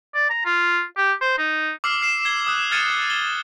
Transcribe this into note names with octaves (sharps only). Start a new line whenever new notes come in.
D5
A#5
F4
G4
C5
D#4
D6 E6 F6 C7
F6 C7 E7
G#6 C7 G7
D#6 E6 F#6
F6 G#6 A6 C#7 D#7
G7